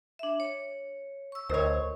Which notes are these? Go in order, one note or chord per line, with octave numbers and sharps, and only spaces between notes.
D4 E5
C#5
C#6 E6
D2 A4 A#4 C5 C#5 D#5